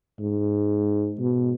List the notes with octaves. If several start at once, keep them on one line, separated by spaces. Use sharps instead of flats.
G#2
B2